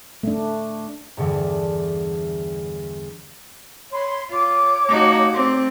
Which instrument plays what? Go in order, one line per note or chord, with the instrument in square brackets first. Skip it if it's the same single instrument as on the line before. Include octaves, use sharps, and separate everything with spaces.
[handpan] A3 D4
[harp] E2 G2 D3 E3
[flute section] C#5 B5 C6
[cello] F4 [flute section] C#5 D6
[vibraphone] A3 G4 F5 [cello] D#4 F#4
[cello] A3 C4 [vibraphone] C6